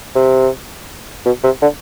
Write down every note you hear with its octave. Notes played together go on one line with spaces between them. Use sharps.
C3
B2
C3
D3